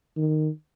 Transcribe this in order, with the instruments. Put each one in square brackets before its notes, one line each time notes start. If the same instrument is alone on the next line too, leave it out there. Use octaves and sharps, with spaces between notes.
[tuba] D#3